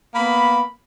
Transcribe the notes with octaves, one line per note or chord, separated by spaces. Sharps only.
A#3 B3 B5